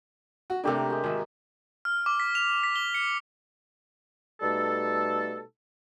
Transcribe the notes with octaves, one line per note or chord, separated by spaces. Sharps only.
F#4
C3 A3 A#3 D4 G4 A#4
G#3 G4
G#1 D#5 E5 E6
F6
D6
B6
F7
B6
G7
C#7
B2 G3 A3 D#4 A4